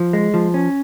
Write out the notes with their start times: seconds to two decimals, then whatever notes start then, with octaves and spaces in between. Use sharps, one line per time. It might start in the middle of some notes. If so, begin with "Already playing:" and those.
Already playing: F3
0.13 G#3
0.34 F3
0.54 C#4